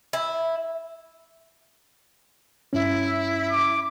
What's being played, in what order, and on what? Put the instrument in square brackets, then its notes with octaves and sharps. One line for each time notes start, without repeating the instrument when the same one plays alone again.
[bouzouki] E4
[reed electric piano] G2 C#4 [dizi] E4
[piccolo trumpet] D6